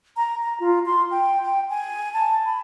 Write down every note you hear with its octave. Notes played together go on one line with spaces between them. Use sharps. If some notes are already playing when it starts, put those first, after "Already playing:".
A#5
A#5
F4
C6
G5
G5
G#5
A5
B5